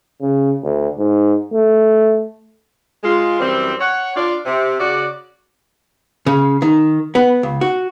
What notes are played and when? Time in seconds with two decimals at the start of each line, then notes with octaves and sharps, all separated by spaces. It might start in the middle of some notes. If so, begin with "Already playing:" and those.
0.21 C#3
0.63 D2
0.98 G#2
1.53 A3
3.04 G#3 F4
3.40 F#2 E3 G3 C4
3.80 C#5 F#5
4.16 D4 F4 D5
4.46 C3
4.80 C#3 F#4 D5
6.26 C#3
6.62 D#3
7.15 B3
7.43 C#2
7.61 F#4